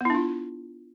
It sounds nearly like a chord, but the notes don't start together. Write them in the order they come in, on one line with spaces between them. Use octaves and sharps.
B3 E4 D4 F4